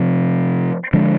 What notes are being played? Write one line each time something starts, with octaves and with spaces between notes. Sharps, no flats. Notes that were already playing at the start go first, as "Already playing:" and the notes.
Already playing: C3 F3 C4
D3 F3 G#3 D4